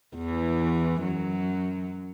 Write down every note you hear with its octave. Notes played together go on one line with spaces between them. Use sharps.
E2 E3
F#2 F#3